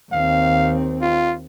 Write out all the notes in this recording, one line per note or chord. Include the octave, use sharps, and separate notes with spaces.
D#2 C4 F5
F4